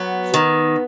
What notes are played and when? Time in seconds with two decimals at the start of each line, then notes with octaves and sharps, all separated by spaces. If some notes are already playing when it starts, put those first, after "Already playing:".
Already playing: F#3 B3
0.34 D#3